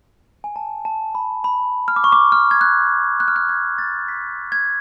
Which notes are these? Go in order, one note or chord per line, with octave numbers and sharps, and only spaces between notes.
G#5
A5
A5
B5
B5
F6
D6
C#6
D6
F6
G#6
F#6
F#6
F6
F#6
G#6
A6
B6
G#6